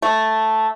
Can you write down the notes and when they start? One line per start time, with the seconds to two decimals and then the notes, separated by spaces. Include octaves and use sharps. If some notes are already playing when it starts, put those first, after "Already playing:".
0.02 A3